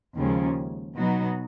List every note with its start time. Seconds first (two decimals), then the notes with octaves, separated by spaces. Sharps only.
0.16 D#2 C#3 F3 G#3 C#4
0.95 B2 F#3 B3 D#4 F#4